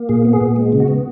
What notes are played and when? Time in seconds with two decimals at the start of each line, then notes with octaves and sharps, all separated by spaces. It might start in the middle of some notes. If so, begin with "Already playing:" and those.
Already playing: A#3
0.09 A#2 G#4
0.25 B3
0.33 G#4
0.41 A#2
0.56 G#3
0.72 C#3
0.80 F#4
0.88 B3